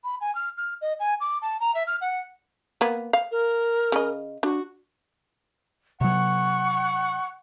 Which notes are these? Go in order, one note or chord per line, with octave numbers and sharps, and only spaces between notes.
B5
G#5
F6
F6
D#5
G#5
D6
A5
A#5
E5
F6
F#5
A#3 B3
F5
A#4
C#3 D#5
D4 F#4
C3 F#3 F#5 C#6